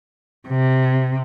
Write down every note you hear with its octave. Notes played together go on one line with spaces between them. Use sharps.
C3